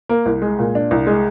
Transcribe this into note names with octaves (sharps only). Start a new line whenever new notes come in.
A#3
C2
G#3
A#2
D4
C2
G#3